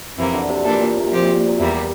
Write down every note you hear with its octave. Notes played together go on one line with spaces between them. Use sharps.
F2 C3 E3 A#3
D3
C3
A#2 E3 A#3 D4 A4
A#2
C3
A#2
C3 F3 C4 G4
A#2
A#2
C3
E2 C3 E3 G3 A#3